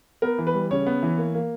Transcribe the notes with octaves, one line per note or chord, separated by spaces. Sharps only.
B3 A#4
E3
B4
G3
C#3 C#5
B3
E3
A#3
A#3